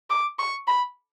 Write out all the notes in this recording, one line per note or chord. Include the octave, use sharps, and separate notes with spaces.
D6
C#6
B5